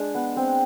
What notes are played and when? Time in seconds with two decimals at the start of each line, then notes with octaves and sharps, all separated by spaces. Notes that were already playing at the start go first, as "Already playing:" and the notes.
Already playing: G#3 D4
0.15 B3
0.36 C4